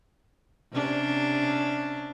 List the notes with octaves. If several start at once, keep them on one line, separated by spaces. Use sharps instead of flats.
C3 C#4 D4